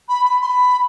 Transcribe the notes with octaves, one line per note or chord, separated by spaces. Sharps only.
B5
B5
C6
B5